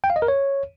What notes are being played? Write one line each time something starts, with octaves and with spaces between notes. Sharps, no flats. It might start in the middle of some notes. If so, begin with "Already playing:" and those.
G5
F5
D#5
A#4
C#5